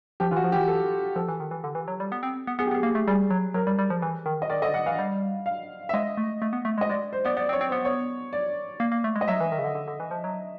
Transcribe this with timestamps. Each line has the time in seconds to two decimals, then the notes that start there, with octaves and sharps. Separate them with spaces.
0.20 F3 G4
0.31 E3 F4
0.36 F#4
0.44 F3
0.52 G4
0.56 E3
0.68 A4
1.16 F3 A4
1.28 E3
1.40 D#3
1.51 E3
1.64 D3
1.75 E3
1.88 F#3
2.00 G3
2.12 B3
2.23 C4
2.47 B3
2.59 B3 G#4
2.67 G4
2.71 B3
2.75 G#4
2.83 A#3
2.95 A3
3.07 G3 G#4
3.30 F#3
3.54 F#3 A#4
3.67 G3
3.79 G3
3.90 F3
4.02 E3
4.26 D#3
4.42 D#5
4.50 D#3 D5
4.62 D3 D#5
4.74 F#5
4.86 E3 F5
4.99 G3
5.46 F5
5.89 E5
5.94 G#3 D#5
6.17 A3
6.42 A3
6.53 B3
6.65 A3
6.78 G#3
6.81 D#5
6.89 G#3 D5
7.13 C5
7.25 B3 D5
7.37 B3 D5
7.49 C4
7.53 C#5
7.61 C4
7.69 C5
7.72 B3
7.85 C#5
8.33 D5
8.80 A#3
8.92 A#3
9.04 A3
9.16 G#3
9.21 D#5
9.28 F#3 E5
9.40 E3
9.52 D#3
9.59 C#3
9.64 D3
9.75 D3
9.88 D3
10.00 E3
10.11 F3
10.24 F#3